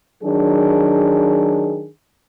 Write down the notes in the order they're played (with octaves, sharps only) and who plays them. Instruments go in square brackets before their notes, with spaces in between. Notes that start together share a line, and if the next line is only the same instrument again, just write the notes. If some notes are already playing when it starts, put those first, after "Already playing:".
[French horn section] D#3 F#3 D4 G#4